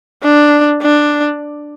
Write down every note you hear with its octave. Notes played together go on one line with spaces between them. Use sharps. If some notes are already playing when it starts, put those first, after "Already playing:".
D4
D4